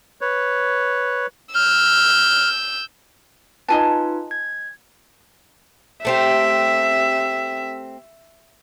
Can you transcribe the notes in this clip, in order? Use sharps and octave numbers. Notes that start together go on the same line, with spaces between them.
B4 C#5
E6 F6 G6
D#4 F4 B4 D#5 G#5 A5
G#6
A3 C4 G4 E5